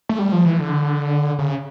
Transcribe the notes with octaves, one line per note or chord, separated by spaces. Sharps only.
A3
G3
F3
E3
D3
C#3